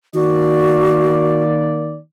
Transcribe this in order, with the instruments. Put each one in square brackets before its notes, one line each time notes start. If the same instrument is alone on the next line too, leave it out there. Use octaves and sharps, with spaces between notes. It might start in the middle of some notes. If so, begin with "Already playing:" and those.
[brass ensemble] D#3 A#3 D5 [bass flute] F#4